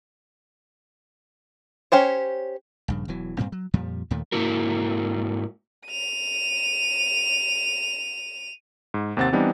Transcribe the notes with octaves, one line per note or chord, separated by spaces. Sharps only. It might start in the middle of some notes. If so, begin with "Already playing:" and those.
C#4 G4 C5 C#5
A#1 G2 C#3
E1 E2 E3 F#3
G2 A#2 G3 C4
F#3
F2 A#2 F3 G3
D#2 A#2 D#3 A3
G#2 A#3 E4 F#4 A#4
D#7 F7
G#2
D#2 C3 C4 F#5 A6
E3 G3 B3 C4 D4 D#4